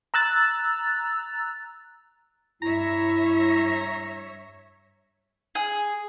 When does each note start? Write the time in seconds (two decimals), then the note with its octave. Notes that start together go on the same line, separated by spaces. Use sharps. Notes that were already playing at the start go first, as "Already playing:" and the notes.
0.14 A#5 E6 F#6 A6
2.62 G2 E4 C#5 E5 A#5
5.55 G#4